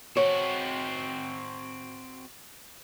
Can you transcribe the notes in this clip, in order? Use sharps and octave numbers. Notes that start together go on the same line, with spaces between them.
C4 F#4 C#5